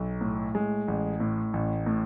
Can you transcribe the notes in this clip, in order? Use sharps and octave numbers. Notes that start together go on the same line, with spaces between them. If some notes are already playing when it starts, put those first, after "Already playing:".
Already playing: B1
A2
G#3
A1
A2
A1
A2